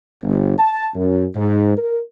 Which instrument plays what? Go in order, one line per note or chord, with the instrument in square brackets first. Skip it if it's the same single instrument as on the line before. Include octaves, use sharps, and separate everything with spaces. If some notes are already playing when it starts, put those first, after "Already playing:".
[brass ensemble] G1
A5
F#2
G#2
A#4